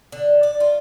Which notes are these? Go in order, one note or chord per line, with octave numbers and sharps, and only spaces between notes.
D3
D5
F4